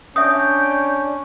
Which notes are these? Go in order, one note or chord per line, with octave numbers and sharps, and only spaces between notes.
C#4 D4 E5 G5 D#6